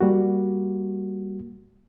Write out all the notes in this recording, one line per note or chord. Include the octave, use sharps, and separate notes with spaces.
G3 A#3 F#4